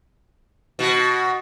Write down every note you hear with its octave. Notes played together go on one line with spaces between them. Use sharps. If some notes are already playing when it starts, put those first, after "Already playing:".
B2 F#4